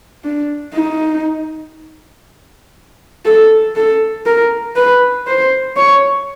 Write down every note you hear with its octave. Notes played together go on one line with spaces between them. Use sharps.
D4
D#4
A4
A4
A#4
B4
C5
C#5